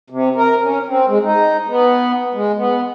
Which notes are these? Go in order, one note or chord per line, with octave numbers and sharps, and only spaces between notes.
C3
A#4
C#4
C4
G#3
D#4
B3
G#3
B3